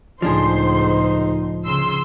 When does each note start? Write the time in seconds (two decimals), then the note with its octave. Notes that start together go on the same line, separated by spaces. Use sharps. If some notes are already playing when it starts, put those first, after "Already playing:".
0.22 C#2 A2 F3 D4 D#4 G#4 C5 C6
1.66 C#3 C6 E6